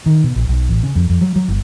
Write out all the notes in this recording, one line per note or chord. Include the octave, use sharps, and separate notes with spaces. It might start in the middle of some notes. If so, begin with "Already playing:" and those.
D#3
B2
A#1
B1
A1
C#3
F2
F2
F#3
F#3
G1